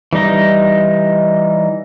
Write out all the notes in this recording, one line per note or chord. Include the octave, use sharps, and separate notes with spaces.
E3 G3 D#4 D#5